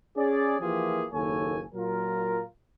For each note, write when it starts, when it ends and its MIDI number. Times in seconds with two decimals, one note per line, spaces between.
0.17 0.56 61
0.17 0.56 68
0.17 0.56 74
0.60 1.04 52
0.60 1.04 53
0.60 1.04 58
0.60 1.04 65
0.60 1.04 67
0.60 1.04 68
1.12 1.61 30
1.12 1.61 39
1.12 1.61 58
1.12 1.61 69
1.12 1.61 73
1.12 1.61 80
1.74 2.42 46
1.74 2.42 54
1.74 2.42 65
1.74 2.42 70